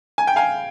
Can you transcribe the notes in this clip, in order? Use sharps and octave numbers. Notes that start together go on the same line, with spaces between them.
G#5
G5
F5 G#5